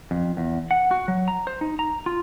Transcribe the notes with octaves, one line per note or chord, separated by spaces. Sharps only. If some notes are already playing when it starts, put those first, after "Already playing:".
F2
E2
F#5
F#4
F#3
A#5
C5
D#4
A#5
F4